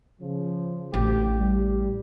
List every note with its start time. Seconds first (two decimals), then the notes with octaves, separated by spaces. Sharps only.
0.22 C#3 F3
0.94 A1 D2 G4
1.38 G3